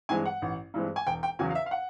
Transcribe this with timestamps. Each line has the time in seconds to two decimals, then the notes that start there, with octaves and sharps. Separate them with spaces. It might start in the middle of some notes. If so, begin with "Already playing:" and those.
0.09 G2 E3 G#3 C4 G#5
0.25 F#5
0.42 A1
0.74 G2 E3 G#3 C4
0.96 G#5
1.07 E1 G5
1.23 G5
1.39 E2 C#3 F#3 G#5
1.50 F5
1.55 E5
1.66 F5
1.71 F#5